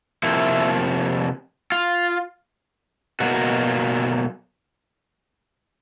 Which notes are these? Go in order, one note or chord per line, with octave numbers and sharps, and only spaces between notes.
C3 F3 A#3 E4
F4
B2 F#3 A#3 F#4